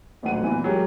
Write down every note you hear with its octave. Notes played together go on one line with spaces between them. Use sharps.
D#1 A1 D2 F#3 F#5 D#7
A#2 E3 B3
F#3 G#3 G4 A#4